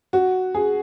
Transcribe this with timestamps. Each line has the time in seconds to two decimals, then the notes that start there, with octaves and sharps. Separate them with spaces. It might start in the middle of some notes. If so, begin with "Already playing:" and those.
0.13 F#4
0.55 G#4